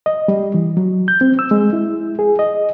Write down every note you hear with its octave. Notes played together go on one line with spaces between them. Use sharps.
D#5
G3
E3
F#3
G6
C4
E6
G#3
E4
G#4
D#5